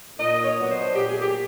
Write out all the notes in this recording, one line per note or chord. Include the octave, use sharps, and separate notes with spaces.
A#2 D#5
C#5
F#3 B3 D4
C5
A#2 G4
G#4
G4